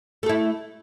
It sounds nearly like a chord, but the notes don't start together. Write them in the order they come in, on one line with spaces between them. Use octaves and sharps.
A3 A4 E4